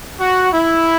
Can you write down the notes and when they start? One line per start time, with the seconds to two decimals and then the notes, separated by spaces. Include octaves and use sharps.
0.19 F#4
0.52 E4